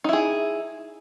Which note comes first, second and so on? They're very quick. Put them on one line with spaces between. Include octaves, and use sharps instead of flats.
D#4 E4 G#4